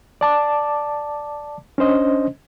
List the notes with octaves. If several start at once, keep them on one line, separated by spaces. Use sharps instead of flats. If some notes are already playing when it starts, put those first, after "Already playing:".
D5 A5 D6
C#4 D4 C5 D#5